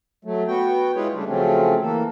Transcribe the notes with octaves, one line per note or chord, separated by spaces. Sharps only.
F#3 A3
B3 F#4 G5
G#3 E4 F4 G#4 B4 C#5
C#3 G3 A3 D4
C#3 F3 F#3 A3 C4 C#4
E3 A#3 A4